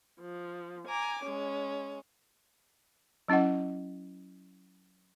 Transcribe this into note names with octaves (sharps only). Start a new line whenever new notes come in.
F3
G#5 A#5 D6
G#3 C#4
F#3 C#4 E4 D#5 F#5